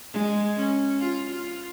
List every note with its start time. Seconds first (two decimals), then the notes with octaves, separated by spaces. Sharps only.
0.13 G#3
0.57 C#4
1.00 F4
1.31 F4